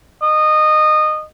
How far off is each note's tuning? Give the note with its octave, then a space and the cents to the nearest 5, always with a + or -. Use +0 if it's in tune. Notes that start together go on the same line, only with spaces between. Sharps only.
D#5 -20